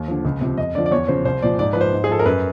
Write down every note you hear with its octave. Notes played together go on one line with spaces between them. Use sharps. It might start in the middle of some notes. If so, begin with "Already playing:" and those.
Already playing: D#2
D3 F3
C#2
C3 F3
F2 D#5
D3 F3 D5
D5
E2 C#5
C#3 F3 C5
C2 C5
A#2 F3 D5
G#2 D5
F3 B4
C5
G#2
G#4
F3 A4
A#4
F#2 B4